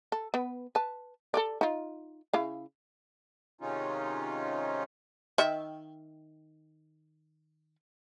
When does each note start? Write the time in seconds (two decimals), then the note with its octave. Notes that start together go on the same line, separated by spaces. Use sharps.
0.12 A4
0.34 B3 B4
0.75 B4 A5
1.34 A4 A#4 D5
1.61 D#4 F4
2.34 C#3 E4 F5
3.61 C3 D#3 G#3 C#4 D#4 F4
5.38 D#3 E5